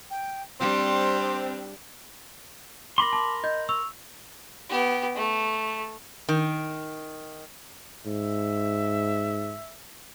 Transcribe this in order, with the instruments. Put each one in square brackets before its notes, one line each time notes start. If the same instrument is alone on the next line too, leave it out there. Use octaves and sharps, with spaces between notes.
[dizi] G5
[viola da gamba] G3 D4 [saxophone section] C4 [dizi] C6
[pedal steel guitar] A#4 B5 C6 [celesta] D6 A#6
[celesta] A5 D6
D#5 G6
C#6 E6 F7
[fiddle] B3 G4
A3
[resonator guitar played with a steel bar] D#3
[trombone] G#2 [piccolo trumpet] E5